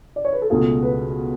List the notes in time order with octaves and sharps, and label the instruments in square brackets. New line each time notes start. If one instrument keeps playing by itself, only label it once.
[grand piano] D5
C#5
B4
A4
[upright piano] C#2 B2 A3 F4 [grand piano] G#4
[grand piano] B4